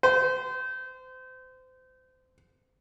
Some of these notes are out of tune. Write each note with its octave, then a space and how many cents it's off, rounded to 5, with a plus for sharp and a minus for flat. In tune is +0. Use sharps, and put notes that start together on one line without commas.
C5 -30